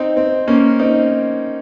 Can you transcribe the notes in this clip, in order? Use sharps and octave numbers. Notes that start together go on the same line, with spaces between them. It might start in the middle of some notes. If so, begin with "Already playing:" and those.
Already playing: C4 D#4
C4
A#3 C#4
C4 D#4